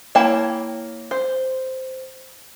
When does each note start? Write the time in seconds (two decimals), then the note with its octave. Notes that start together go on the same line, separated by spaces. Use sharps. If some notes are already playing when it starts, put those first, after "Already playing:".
0.15 A#3 E4 C#5 G5 A5
1.11 C5